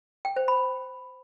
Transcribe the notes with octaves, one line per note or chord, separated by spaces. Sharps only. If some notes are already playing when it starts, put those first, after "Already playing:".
G5
C5
B5